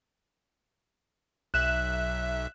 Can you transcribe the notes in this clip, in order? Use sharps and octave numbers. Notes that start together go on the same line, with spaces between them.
B1 E5 F#6 E7